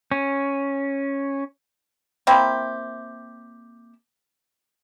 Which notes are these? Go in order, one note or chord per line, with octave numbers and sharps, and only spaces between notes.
C#4
A#3 C4 E4 G4